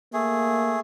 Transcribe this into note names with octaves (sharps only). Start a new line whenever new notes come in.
A3 A#3 G#4